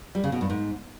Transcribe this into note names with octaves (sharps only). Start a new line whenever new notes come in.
G3
C#3
B2
G2
G#2